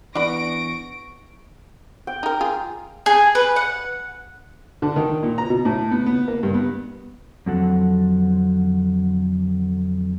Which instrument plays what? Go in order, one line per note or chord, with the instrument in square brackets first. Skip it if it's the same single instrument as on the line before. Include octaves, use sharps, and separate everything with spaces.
[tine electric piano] E3 B3 [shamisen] D4 B5 [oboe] C#6 [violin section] A#6 D7
[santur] G5
[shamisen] D#4 A#4
F4 G#4
[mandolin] G#4
B4
F#5
[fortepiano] D3
D#3
A#2
A#5
B2
A2
B3
B3
A#3
G2
B3
[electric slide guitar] F2 D3 F#3 C4 A4 F#5